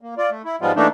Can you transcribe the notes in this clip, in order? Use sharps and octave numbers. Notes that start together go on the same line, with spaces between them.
A#3
F4 D5
A3
E4
G#2 F3 G3 G#3 B3 F4
E3 A3 A#3 D4 D#4